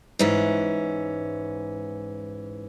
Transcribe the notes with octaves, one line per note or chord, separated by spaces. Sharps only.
G#2 E3 C#4